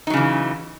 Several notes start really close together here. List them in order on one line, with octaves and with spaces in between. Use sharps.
D#4 F#3 C#3 E3